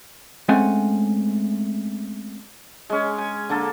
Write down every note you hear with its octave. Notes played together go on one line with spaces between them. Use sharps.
G#3 A3 C4 C#4 F#5 G#5
G#3 C#4
G#5
D3 A#3 A4